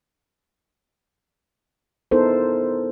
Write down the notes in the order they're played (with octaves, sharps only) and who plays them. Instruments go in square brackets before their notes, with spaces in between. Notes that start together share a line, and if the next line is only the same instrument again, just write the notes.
[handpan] B3 D#4 E4 A4 A#4 C5